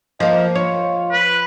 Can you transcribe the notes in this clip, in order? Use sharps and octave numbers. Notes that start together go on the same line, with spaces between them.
F3 A#3 D#5
F4 C#5
B4